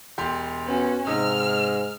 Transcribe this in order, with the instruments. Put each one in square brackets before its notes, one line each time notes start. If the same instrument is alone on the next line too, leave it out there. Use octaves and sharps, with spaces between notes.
[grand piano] E1 G4 C6
[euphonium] B3 [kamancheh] C#4 F#4
[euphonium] G#2 [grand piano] C3 D#4 D#6 [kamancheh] F6